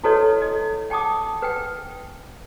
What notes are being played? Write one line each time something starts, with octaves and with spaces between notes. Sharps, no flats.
E4 F#4 A4 B4 C#5 D#5
D#5
F#5 G5 A5 D6 D#6
B4 F#5 G5